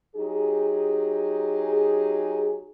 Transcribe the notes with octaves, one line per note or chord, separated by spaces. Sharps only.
F#3 D#4 G4 G#4